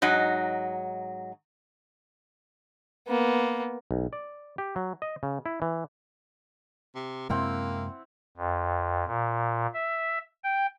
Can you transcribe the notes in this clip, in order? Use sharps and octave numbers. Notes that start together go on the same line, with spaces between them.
G#2 F#3 D#4
A#3 B3
B1
D5
G4
F#3
D#5
C#3
E4
E3
C3
F#2 C3 G#3 A#3 C4 E4 F#5
F2
A#2
E5
G5